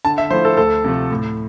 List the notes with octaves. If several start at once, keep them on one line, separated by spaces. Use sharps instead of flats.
D3 A5
E5
F3 A3 E4 C5
A4
D2 A4
C3 F3 A3
A2